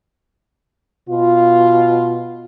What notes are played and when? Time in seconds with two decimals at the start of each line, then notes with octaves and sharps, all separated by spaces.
1.08 B2 F4